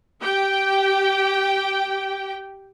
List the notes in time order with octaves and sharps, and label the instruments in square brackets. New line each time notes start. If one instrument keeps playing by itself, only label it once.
[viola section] G4 G5